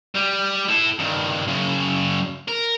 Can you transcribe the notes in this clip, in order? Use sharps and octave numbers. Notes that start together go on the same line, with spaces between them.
G3
E4 A4
G2 D#3
F#2 C#3
A#4